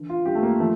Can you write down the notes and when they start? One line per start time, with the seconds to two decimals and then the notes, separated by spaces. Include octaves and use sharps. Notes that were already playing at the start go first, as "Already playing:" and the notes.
Already playing: D3 E3
0.10 F4
0.25 G2 G4
0.35 A3
0.43 A#3
0.60 F3 A3